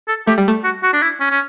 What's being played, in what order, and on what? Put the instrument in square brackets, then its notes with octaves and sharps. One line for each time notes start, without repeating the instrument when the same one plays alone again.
[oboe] A4
[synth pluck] A3 [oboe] G4
[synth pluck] G3
A3
[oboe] F#4
F#4
D4
E4
C#4
C#4